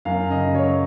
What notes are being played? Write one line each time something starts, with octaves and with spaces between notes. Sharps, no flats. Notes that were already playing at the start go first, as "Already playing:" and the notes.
F#2 F5
C#3 D#5
F#3 C#5